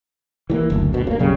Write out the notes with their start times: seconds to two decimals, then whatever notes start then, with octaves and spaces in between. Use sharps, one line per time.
0.50 E3 F#3 A#3
0.70 F#1 D2
0.93 D2 B2
1.07 C#3 A#3
1.19 B1 F#2 C#3 G3